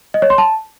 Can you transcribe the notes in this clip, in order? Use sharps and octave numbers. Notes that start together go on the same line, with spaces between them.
D#5
C#5
C6
A5